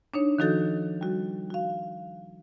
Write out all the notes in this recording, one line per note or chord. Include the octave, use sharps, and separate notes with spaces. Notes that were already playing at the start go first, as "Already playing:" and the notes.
D4 D#4 C#5
D#3 F3 D#4 F#4 A4 G6
G3 F#4
F#4 F5